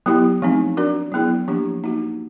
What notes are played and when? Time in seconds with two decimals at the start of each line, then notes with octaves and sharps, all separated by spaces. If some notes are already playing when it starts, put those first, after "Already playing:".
0.06 F#3 B3 E4 G4
0.42 F3 A3 C4 D#4
0.77 D4 F#4 A#4 D5
1.12 F#3 B3 E4 G#4
1.48 F3 A#3 D4 G4
1.83 A#3 D#4 F#4